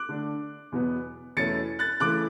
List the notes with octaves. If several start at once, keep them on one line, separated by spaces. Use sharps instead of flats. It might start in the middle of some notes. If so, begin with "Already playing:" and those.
Already playing: D6 F#6
D3 A3 D4
E2 B2 F#3 B3
E2 B2 A3 C#4 E4 A6 C#7
F#6 A6
C#3 E3 A3 E4 D6 F#6